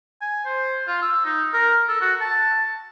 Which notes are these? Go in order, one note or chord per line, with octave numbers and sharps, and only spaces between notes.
G#5
C5
F4
E6
D#4
A#4
A4
F#4
A5